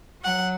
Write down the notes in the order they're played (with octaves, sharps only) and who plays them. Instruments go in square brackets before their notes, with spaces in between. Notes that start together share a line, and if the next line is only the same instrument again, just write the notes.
[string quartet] F#3 F#5